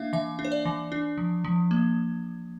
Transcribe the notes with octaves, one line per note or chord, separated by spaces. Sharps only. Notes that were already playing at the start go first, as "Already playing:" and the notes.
Already playing: A#3 D4 E5 F5
E3 E5
D4
C5
D5
E3
D4
F3
F3
A#3